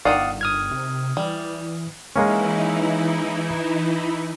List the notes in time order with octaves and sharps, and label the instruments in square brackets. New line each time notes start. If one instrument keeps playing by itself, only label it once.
[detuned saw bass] G1 [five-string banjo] D#3 E3 D5 [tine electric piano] F5 F#5 D#6
[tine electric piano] D#6 F6 G#6
[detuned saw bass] C3
[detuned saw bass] E3 [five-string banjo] G3
[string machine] E3 D#4 E4 [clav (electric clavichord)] G#3 A#3 C#4